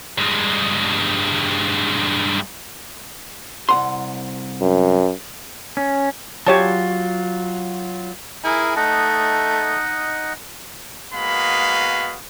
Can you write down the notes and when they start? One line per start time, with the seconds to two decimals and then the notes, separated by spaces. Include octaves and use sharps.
0.18 G2 G#3
3.69 C2 F#5 C6
4.61 F#2
5.77 C#4
6.47 F#3 F4 G4 C#5 A5
8.44 E4 G#4 A#4 G#5
8.76 A3 D#4 D#5 F#5 A5
11.14 G#3 A#3 B3 F#4 F5 B5